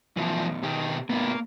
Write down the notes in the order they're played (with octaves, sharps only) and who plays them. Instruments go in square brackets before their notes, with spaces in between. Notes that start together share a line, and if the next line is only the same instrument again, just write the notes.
[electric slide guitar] F#2 B2 [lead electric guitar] E3 F3
[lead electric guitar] B2 G4 [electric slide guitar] D#3
[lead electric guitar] A2 B3 [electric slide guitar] A#3 A#4